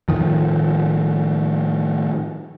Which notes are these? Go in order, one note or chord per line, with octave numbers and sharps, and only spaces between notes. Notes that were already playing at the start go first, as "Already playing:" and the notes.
A2 D#3 F3